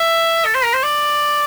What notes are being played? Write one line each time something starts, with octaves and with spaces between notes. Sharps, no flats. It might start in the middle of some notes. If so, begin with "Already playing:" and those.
Already playing: E5
A4
C5
A#4
C5
D5